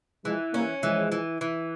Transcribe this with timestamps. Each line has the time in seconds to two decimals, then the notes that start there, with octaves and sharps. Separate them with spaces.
0.25 E3 F3 G#3
0.54 G3 A#3 C#4
0.83 E3 F3 G#3
1.12 E3
1.41 E3